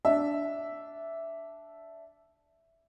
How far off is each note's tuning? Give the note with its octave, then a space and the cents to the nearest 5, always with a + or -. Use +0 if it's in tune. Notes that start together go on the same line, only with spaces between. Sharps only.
D4 -10 E5 +0